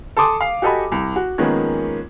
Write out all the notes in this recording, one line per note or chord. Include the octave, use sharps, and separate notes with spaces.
A4 A5 C6 D6 D#6
F5
F#4 G4 A4 D#5 G#5 B5
C2
F#4
D#3 F3 G#3 A#3 B3 C#4